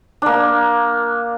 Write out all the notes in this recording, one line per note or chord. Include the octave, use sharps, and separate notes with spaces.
A#3 D4